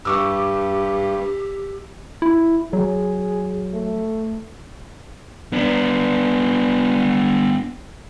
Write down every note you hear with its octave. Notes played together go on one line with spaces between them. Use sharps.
G2 G4 C#6 D6 E6
E4
F#3 G#4
A3
B3 D4